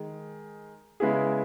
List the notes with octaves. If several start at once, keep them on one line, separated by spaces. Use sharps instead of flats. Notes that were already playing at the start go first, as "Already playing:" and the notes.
Already playing: D#3 G#3 G#4
C#3 G#3 B3 E4 G#4